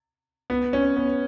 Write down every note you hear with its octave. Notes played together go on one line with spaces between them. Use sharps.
B3
C#4
B3